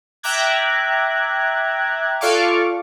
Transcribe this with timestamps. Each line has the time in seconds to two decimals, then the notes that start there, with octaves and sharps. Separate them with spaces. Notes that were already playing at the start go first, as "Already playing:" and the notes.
0.23 E5 G5 A#5 D6 F#6 G#6
2.21 F4 A4 D5 F5 C#6 D6